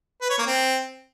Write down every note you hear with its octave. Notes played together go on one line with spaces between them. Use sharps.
B4
C#5
A#3
C4